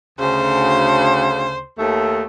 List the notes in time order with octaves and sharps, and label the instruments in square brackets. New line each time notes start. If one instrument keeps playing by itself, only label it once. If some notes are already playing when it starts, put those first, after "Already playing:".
[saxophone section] D2 C#3 [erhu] C5
[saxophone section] D#2 A3